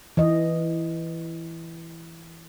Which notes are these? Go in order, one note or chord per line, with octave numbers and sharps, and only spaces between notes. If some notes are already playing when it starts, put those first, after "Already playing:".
E3 D#5